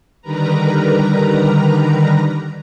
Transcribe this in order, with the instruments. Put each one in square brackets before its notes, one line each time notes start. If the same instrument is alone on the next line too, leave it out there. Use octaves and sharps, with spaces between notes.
[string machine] D3 D#3 G3 A#4 B4 A#5